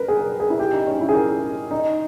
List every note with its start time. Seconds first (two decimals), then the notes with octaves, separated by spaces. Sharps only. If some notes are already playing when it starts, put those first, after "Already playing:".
Already playing: A#4 B4
0.08 G#4
0.21 A#4
0.40 G#4
0.50 E4
0.59 G4
0.73 D#4
0.87 C#4
1.01 E4
1.09 G#4
1.15 A#4
1.71 D#4